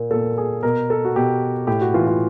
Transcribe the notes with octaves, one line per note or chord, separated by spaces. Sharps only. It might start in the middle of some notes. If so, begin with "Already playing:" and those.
Already playing: A#2
A#2 A4
G#4
B2 A#4
A4
F#4
B2 G4
A2 G4
F#4
E3 F4
F4